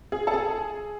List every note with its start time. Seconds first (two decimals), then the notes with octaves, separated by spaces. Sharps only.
0.12 G#4
0.27 A4
0.34 G#4